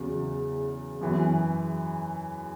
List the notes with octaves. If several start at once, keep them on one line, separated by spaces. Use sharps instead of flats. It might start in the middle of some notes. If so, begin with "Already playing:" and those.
Already playing: E2 C#3 F#3
F#2 E3 B3